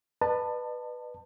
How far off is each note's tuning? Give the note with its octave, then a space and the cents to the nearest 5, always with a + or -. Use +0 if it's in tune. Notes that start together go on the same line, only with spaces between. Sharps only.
B4 +0 D#5 -45 A5 +20